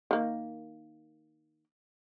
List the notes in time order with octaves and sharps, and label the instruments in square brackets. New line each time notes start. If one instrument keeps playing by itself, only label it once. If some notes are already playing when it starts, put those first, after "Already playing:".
[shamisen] D#3 A#3